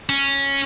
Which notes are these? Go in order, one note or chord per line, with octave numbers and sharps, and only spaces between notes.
C#4